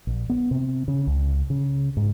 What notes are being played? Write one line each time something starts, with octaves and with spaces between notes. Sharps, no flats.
A#1
B3
C3
C#3
C#2
C#3
G#2